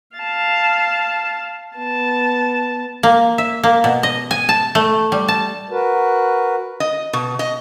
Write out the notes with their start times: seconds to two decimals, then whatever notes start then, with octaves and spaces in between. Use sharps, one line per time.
0.17 F5 A5
1.77 B3 A5
3.03 A#3
3.38 E5
3.63 A#3
3.84 B2
4.03 D#5
4.31 G#5
4.49 A5
4.75 A3
5.12 G3
5.28 A5
5.70 F#4 A#4 B4
6.80 D#5
7.13 B2
7.39 D#5